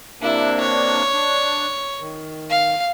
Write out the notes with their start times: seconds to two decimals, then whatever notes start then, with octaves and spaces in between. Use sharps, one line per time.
0.22 C3 A#3 D4 E4
0.60 C#5
1.13 D4
2.00 D#3
2.50 F5